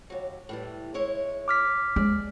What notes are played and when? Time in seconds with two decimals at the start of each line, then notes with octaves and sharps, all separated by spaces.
0.10 D#2 F#3
0.49 A2 E3 G3
0.94 G#3 E4 C#5
1.48 D6 F6 B6
1.96 G#3 D5